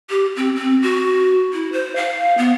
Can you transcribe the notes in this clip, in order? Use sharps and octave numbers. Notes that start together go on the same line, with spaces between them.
G4
C4
C4
F#4
E4
C5
F5
B3